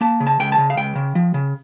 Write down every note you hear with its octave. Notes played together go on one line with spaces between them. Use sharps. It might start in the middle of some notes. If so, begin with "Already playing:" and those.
A#3 A5
C#3
A5
C#2 G5
A5
C#3
F5
C#2 G5
C#3
F3
C#3